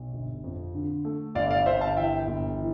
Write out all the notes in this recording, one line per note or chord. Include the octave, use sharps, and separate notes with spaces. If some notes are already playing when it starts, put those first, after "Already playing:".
Already playing: B1
G1
F2
D3
A3
G1 D5 F5
D5 F5
G1 C5 E5
F5 A5
E3 E5 G5
G1
E3